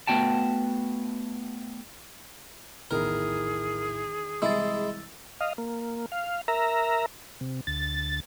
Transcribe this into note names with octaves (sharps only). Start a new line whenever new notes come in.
A3 B3 F#4 G5 A5
A#1 E2 A2 D#3 E4 G#4 A#4
C2 E3 G#3 E4 E6 A6
D#5 F5
A#3
F5
A#4 E5 A#5
C3
D2 A6